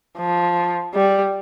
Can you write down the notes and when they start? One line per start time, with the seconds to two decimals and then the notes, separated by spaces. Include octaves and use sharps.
0.19 F3
0.94 G3